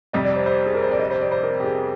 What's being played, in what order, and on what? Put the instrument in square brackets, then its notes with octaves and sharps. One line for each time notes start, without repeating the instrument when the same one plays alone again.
[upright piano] F2 C3 G3 [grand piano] D#5
[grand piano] D5
C5
C5
G#4
A#4
C5
D5
D#5
C5
D5
C5
A#4
G4
G#4